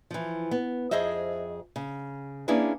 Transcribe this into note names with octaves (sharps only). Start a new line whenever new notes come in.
E3 F3
B3
F2 G#4 C5 D#5 E5
C#3
A#3 C#4 D4 E4 G#4 B4